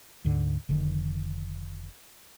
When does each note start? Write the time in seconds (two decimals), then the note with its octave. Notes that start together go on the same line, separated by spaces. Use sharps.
0.25 D2 G#2 D3
0.69 F1 D3 D#3